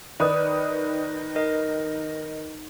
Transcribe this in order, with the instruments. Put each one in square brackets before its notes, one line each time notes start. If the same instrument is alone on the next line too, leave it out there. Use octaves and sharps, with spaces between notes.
[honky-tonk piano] D#3 B4 D#6 [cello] D#4 [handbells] D5
[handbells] A#4 D#5